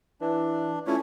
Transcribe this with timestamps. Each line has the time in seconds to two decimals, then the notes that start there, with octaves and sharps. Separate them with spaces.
0.21 E3 D4
0.87 A3 C#4 E4 F4 C#5